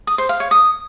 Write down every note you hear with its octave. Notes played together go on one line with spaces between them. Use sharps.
D#6
C5
F5
C#5
D#6